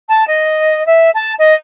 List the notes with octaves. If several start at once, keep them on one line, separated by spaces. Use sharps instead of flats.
A5
D#5
E5
A5
D#5